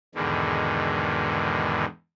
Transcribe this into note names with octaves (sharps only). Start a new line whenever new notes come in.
E2 G#2 B2 D3 D#3